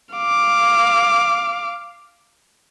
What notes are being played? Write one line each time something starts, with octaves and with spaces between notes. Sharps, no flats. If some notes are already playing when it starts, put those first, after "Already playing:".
F5 D6